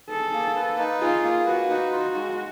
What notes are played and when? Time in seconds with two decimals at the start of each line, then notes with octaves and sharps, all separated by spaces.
0.10 G#4 A4
0.33 A#3
0.56 B4
0.79 D#4
1.01 F4 G#4
1.24 A#3
1.47 F#4 B4
1.70 D#4
1.92 F4 F#4
2.14 G#3